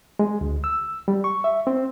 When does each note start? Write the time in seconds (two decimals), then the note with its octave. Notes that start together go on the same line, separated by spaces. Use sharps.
0.19 G#3
0.41 D2
0.64 E6
1.08 G3
1.24 C#6
1.44 E5
1.67 C4